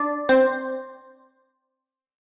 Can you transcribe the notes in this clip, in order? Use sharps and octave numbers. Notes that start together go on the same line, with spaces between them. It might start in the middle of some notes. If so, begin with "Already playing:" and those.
Already playing: D4 D5
C4 C5